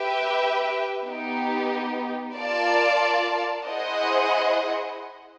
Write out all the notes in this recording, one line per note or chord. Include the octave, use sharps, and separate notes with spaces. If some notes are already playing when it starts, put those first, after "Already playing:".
Already playing: G4 B4 E5 G5
B3 D#4 G4
F4 A#4 D5 F5 A5
E4 G#4 C5 D#5 F#5